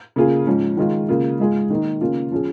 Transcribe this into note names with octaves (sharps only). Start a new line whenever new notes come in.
C#3 A#3 F4 G#4
G#2 F3 C#4
D#3 G#3 F4
C#3 A#3 F4
G#2 G#3 F4 G#4
D#3 A#3 D#4
C#3 A#3 C#4 F4
F3 C#4 G#4